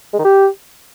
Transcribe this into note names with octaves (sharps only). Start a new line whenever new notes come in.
G#3
D#3
G4